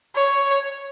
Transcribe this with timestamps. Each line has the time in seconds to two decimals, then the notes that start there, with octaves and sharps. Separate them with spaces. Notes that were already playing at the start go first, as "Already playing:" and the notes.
0.15 C#5